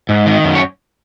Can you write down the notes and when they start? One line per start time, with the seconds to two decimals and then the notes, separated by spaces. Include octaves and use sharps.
0.09 G#2
0.26 D#3
0.44 F#2
0.55 C#5